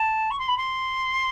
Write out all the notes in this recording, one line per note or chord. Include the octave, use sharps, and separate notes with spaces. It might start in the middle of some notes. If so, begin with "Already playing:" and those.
Already playing: A5
C#6
C6
B5
C6